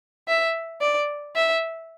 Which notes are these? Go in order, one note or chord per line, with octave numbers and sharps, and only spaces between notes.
E5
D5
E5